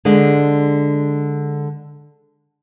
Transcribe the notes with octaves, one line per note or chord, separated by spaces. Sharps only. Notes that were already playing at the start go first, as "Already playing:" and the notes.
D3 G#3 D4